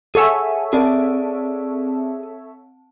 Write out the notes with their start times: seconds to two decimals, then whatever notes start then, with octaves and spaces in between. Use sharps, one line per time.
0.15 G#4 A4 C#5 E5 F#5 G#5
0.73 C4 G#4 D5 A5